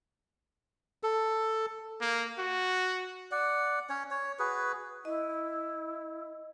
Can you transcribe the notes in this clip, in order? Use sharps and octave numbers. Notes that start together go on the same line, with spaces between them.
A4
A#3
F#4
D5 F#5
C#4 C#5
C#5
F#4 G#4 B4
E4 D#5